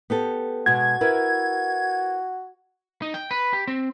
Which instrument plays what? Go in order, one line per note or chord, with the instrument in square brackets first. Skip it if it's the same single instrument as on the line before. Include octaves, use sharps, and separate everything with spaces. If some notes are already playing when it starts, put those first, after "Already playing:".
[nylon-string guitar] B3 G4 A4
[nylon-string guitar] B2 G#3 [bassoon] F#4 [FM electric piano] G#6
[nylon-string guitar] E4 A#4 B4
[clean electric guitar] D#4
G5
B4
G4
C4